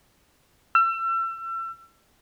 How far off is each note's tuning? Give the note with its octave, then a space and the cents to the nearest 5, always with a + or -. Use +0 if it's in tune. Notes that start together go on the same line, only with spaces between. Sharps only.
E6 +35